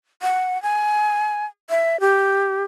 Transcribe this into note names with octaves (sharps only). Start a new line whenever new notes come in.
F#5
G#5
E5
G4